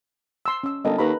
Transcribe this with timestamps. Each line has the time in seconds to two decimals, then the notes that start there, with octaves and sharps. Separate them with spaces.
0.46 C6 E6
0.63 C#4 E6
0.85 G1 A4 A#4 D#5
0.98 D#2 B4 A#5 B5